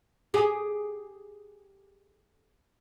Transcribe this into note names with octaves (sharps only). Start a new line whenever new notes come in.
G4 G#4